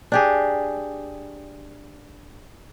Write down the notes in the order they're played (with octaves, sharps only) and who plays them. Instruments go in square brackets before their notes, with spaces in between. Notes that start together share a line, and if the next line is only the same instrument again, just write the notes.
[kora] D4 G4 G#4